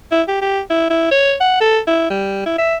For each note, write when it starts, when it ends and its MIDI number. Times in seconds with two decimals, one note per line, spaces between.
0.12 0.22 64
0.28 0.37 67
0.42 0.61 67
0.70 0.89 64
0.90 1.11 64
1.11 1.35 73
1.41 1.58 78
1.61 1.79 69
1.87 2.09 64
2.10 2.42 55
2.46 2.53 64
2.58 2.76 76